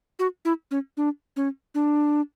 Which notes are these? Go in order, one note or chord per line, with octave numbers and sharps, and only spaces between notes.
F#4
E4
C#4
D4
C#4
D4